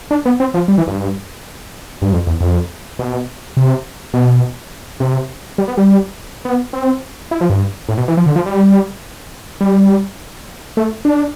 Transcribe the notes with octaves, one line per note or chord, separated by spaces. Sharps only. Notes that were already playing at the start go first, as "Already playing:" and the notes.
D4
B3
C4
F3
G3
E3
G2
G2
F2
E2
F2
B2
C3
B2
C3
G3
B3
G3
B3
C4
E4
F3
G2
A2
B2
E3
F3
D3
F3
G3
G3
A3
D4